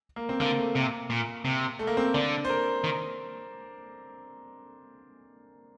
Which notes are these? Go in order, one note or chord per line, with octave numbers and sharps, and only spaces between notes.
A#3
C4
D3 A#3
A3
C3 A#3
A#2
C3
A3
A#3
C4
D3 D4
C5
A#4
D#3